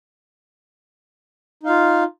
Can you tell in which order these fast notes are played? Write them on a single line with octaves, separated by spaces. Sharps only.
D#4 F5 F4